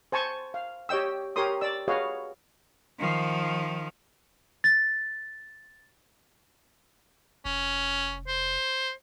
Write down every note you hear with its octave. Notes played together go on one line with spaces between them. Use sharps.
C5 G#5 A5 C#6
F5
G4 C#5 D#5 G5 E6
G4 A#4 C#5 C6 D#6
D5 E6
F#4 G#4 B4 C#5 D#5 F5
D#3 F3
A6
F1 C#4
C5